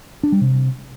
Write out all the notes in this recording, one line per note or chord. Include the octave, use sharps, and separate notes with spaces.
D4
G3
C3